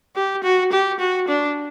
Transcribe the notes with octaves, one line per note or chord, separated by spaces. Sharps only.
G4
F#4
G4
F#4
D4